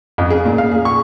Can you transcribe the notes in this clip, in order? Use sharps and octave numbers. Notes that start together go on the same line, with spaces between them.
F2
G#4
A#2
F5
G#4
C#6